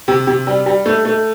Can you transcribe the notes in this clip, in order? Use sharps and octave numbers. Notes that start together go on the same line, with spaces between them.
C3
C3
G3
G3
A3
A3